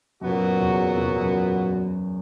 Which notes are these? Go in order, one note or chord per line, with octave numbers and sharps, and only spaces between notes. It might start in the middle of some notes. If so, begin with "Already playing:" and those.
F#2 A#2 F#3 B3 F#4
E2
E2
F#2